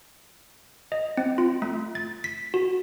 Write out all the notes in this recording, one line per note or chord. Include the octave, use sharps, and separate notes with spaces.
D#5
C4
F4
A3
A6
B6
F#4